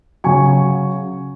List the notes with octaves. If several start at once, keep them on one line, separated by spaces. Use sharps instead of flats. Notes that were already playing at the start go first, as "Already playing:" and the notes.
C#3 F#3 G#5 C#6